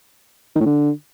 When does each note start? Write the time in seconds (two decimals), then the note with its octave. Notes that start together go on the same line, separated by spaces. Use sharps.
0.56 D#3
0.61 A2
0.66 D3